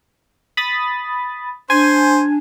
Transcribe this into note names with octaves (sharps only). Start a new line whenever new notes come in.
B5 D#6 A6
D4 C5 G#5